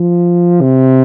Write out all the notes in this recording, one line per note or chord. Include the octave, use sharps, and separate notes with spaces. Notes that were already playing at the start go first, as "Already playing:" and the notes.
Already playing: F3
C3